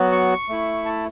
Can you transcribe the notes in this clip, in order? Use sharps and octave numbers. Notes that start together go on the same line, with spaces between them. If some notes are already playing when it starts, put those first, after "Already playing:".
Already playing: F#3 B3 F#4
C#6
A3 E4
A5